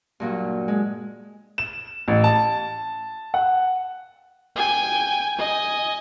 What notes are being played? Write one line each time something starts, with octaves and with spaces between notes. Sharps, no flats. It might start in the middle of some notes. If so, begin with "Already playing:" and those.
G2 A#2 F#3
G#3
E7
A1
A5
F#5
G5 G#5
D#5 G#5